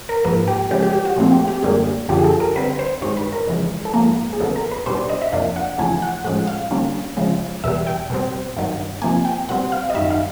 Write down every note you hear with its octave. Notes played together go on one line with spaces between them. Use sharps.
A#4
G#2 F3 A#3 B4
G4
C#3 F3 G#3 G4
G4
G4
F#4
A#2 F3 A3 C4
G4
G4
F#2 D3 G3 A#3 G#4
F#2 D3 F3 G4
G#4
A4
A#4
D3 G3 C4 B4
C5
G2 D#3 G#3 C#5
B4
A#4
F2 C#3 E3 G#3
A4
G#2 F3 A#3 A#4
G#4
E2 C#3 F#3 B3 A4
A#4
B4
B2 G3 B3 D4 C5
D5
D#5
E5
F2 C3 F3 A#3 D4 F5
F#5
E2 C#3 F3 A3 G#5
F#5
A2 F3 G#3 C#4 F#5
F5
D3 G3 A#3 C#4
C#3 F3 G#3
E2 B2 G3 E5
G5
B2 G3 C4
G2 D#3 F#3
C3 F3 A#3 G#5
G5
B2 G3 C4 F#5
F5
D#5
F#2 D#3 G3 E5
F5